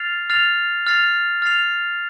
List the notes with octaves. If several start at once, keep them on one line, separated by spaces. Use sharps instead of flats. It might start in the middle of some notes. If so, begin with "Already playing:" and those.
Already playing: F6 A6 C7 F7
F6 A6 C7 F7
F6 A6 C7 F7
F6 A6 C7 F7